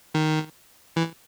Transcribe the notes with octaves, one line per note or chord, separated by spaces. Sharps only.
D#3
E3